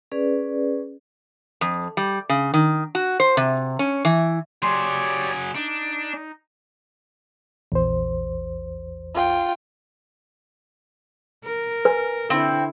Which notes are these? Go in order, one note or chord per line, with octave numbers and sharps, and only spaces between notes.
C#4 G#4 B4 D5
F2
G3
C#3
D#3
F#4
C5
C3
C#4
E3
F#3 G4 G#4 C#5 D5 C6
D4 D#4
A#1 E2 C5
F4 G5
A#4
B4 G#5
D3 C4 E4